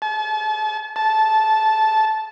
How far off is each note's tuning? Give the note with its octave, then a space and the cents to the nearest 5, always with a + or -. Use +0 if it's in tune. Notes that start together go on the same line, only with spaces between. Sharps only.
A5 -40
A5 -10